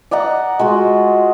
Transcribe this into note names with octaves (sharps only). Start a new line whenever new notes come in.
D5 D#5 F#5 A#5
G#3 F4 F#4